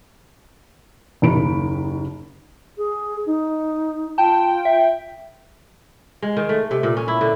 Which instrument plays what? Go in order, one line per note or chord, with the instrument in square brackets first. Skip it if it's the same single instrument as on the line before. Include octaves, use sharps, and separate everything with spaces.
[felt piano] F#1 D#2 D#3 B5 D7
[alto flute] G#4
D#4
[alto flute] F4 [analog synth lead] G5 [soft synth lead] A5
[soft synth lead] E5
[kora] G#3
D#3
A3
C3
A#2
C#4
E4
D3